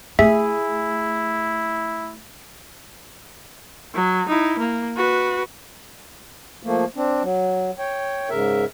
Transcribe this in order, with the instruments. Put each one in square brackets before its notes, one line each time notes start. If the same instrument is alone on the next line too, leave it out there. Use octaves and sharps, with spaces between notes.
[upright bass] A3 [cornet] E4 [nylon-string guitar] G#4 [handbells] E5
[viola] F#3
D#4 E4
A#3
F#4 B4
[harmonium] F3 A3 A#3
C4 D4
F#3
C#5 G5
G#2 C#3 A#4 E5